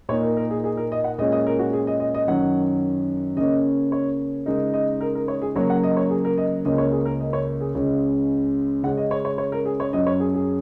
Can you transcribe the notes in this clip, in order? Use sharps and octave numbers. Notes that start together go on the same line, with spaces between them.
A#2 A#3 D#4 C#5
A#4
A#4
G#4
G#4
A#4
D#5
F#5
A#2 G#3 C#4 D#5
D#5
A#4
F#4
G#4
D#5
D#5
D#5
F#2 D#3 F#3 C#4 F#5
C#3 A#3 C#4 D#5
C#5
C#3 G#3 D#4 A#4
D#5
A#4
A#4
C#5
G#4
C#3 F#3 A#3 C#5
F#5
D#5
C#5
G#4
A#4
D#5
C#2 C#3 A#3 C#4 D#5
C#5
G#4
A#4
D#5
C#5
G#4
C#2 C#3 G#3 C#4
C#3 G#3 C#4 F#5
D#5
C#5
C#5
C#5
A#4
G#4
C#5
F#2 F#3 C#4 D#5
C#5
G#4
G#4